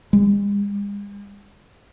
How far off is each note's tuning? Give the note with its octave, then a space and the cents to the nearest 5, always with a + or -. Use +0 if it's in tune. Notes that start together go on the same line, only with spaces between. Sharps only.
G#3 -45